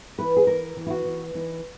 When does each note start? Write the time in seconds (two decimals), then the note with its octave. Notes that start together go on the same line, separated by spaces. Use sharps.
0.18 E3 B4
0.37 G#4
0.47 E3 A#4
0.77 E3
0.87 E4
0.90 F#4
1.05 E3
1.35 E3 D#4